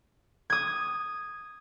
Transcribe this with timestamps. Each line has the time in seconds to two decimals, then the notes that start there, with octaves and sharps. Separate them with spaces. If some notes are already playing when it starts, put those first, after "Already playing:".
0.50 D#6 G#6